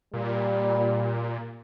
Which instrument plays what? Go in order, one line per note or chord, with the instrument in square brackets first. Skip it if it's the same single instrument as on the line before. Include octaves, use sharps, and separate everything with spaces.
[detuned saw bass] A#2 [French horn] G3